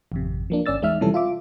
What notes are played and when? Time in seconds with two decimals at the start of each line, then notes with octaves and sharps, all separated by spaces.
0.12 G#1 F2 C3
0.50 F3 A#3 D4
0.66 G#1 C#4 D5 E6 A6
0.82 E2 G#3 D#4 E5 F6
1.01 C3 E3 F3 G3 C#4 A4
1.14 F4 E5 D6